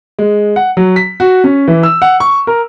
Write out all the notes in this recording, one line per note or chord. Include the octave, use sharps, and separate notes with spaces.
G#3
F#5
F#3
B6
F#4
C#4
E3
E6
F#5
C#6
A#4